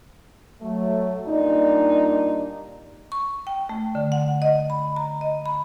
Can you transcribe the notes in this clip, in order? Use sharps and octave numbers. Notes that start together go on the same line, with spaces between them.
F#3 A3
A#2 G3 D4 D#4
C#6
G5
A3
D3
F#5
D#5
B5
A#5
D#5
B5